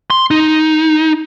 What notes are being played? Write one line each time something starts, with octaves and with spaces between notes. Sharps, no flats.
C6
D#4